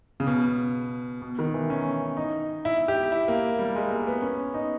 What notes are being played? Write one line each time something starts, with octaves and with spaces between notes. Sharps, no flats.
C#3
B2
B2
D#3
E3
C#4
D#4
E4
G4
E4
A#3
G3
G#3
A#3
B3
C#4
D#4